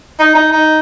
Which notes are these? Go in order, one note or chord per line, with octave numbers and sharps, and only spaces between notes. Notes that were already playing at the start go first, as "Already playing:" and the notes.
D#4
D#4
D#4